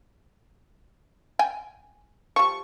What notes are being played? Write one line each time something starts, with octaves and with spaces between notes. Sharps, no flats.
G5 G#5
F3 G3 C#6